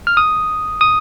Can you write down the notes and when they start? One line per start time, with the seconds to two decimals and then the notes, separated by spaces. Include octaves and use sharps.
0.07 F6
0.17 D#6
0.81 D#6